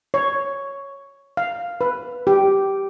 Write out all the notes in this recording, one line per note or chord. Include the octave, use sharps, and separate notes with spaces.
C#5
F5
B4
G4